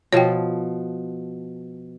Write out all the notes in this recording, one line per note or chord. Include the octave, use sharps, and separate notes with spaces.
B2 F3 C#5 G5